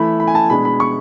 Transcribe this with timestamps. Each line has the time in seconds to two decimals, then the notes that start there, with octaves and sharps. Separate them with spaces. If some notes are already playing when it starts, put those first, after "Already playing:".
Already playing: E3 A3 E4 B5
0.20 B5
0.27 G#5
0.35 A5
0.50 B2 G#3 D4 B5
0.65 B5
0.80 C#6